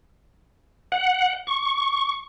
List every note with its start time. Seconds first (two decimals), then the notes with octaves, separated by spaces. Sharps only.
0.92 F#5
1.47 C#6